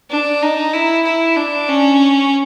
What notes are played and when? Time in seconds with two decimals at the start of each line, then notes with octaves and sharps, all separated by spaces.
0.10 D4
0.42 D#4
0.73 E4
1.05 E4
1.36 D4
1.68 C#4